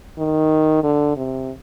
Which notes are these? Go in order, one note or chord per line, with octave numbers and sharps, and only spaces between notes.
D#3
D3
C3